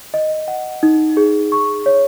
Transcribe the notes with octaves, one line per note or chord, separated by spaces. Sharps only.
D#5
F#5
D#4
G#4
C#6
C#5